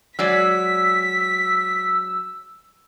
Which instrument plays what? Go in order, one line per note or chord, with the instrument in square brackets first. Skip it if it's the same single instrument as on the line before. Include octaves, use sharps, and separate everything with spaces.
[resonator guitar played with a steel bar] F#3 G#3 D5 [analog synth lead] E6 [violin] B6